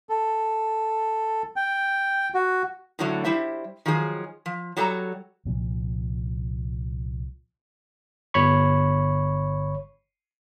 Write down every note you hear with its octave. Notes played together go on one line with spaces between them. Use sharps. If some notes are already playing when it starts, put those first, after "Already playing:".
A4
G5
F#4
A2 D3 F#3 A3
G3 E4 C5 E5
D#3 F3 F#3 G#4
F3
F#3 G3 A4 G5 A#5
C2 A#2 F3
G1 C#5 B5 C#6